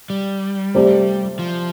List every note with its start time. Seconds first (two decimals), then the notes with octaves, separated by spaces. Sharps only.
0.10 G3
0.75 C3 A3 C4 G4 D5
1.39 F3